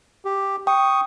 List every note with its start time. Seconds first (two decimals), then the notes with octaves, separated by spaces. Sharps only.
0.25 G4
0.67 G5 C#6 D#6